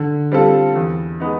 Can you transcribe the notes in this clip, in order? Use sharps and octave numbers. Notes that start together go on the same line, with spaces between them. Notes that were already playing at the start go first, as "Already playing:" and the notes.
Already playing: D3
G3 C4 F4 A4
E2
G#3 B3 D#4